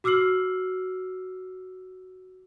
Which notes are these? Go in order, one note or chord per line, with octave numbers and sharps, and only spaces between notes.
F#4 D6 E6 F6 C7 F#7